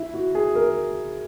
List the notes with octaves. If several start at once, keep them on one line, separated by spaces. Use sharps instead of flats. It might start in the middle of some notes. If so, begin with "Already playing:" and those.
Already playing: E4
F#4
G#4
A#4